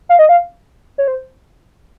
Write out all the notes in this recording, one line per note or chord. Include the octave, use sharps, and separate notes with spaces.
F5
D#5
F5
C#5
C5